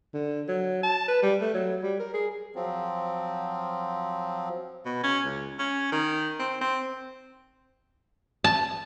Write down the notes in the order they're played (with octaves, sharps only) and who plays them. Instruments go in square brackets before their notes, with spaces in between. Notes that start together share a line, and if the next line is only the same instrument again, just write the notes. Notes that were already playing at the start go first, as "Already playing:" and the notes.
[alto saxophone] D3
F#3
A5
B4
G3
A3
F#3
G3
A#4
G#4
[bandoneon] F3 F#3 C4
[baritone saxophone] B2
C#4
C#2
C#4
D#3
C4
C4
[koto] A5